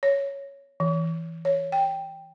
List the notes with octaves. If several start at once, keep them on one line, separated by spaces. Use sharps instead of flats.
C#5
E3
C#5
G5